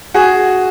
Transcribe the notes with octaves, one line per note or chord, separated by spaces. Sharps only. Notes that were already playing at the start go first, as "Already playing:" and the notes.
F#4 G#4